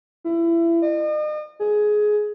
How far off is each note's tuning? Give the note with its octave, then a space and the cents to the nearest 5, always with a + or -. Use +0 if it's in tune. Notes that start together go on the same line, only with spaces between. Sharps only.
E4 +25
D#5 -40
G#4 +15